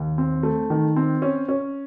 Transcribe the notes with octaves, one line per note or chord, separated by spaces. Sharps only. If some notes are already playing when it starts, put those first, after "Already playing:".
Already playing: D#2
C4
A3
D#3
C4
C#4
C#4